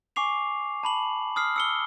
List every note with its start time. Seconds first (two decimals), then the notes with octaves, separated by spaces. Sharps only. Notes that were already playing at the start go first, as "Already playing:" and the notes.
0.16 G#5 C#6 D6 C7 F7
0.83 A5 B5 F#7
1.36 D#6 F6 C7
1.56 E6 C#7 G7